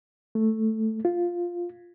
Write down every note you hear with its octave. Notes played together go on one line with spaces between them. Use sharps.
A3
F4